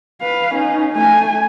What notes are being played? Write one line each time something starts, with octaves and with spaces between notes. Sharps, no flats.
B4 F5
C#4 D#4
A3 G#5